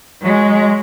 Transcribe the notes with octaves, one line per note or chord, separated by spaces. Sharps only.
F#3 G#3